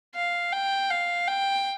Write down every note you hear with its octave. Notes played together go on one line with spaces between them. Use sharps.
F5
G5
F5
G5